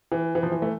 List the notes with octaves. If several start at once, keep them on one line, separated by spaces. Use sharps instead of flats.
E3
E3
F3
E3
A3